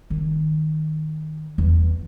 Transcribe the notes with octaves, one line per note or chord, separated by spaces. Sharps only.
D#3
E2